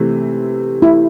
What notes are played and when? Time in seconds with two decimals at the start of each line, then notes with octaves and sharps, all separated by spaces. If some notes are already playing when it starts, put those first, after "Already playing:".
Already playing: C3 E3 A3 C4
0.82 E4